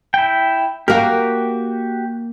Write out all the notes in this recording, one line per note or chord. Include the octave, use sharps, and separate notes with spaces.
E4 G5
A#3 F#4 G4 A#4